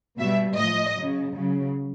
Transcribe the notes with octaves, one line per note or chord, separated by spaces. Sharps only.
B2 G3 E5
A2 F3 D#5
C#3 F#3
C#3 F#3